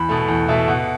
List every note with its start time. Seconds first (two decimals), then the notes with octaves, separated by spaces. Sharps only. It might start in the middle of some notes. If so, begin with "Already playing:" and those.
Already playing: E2 B5
0.09 B2 A3
0.28 E2
0.48 B2 A3 E5
0.68 B2 F#5